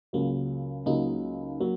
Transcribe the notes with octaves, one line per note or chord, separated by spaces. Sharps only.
C#2 C#3 F#3 A#3
C#2 C#3 F#3 A#3 D#4
F#3 A#3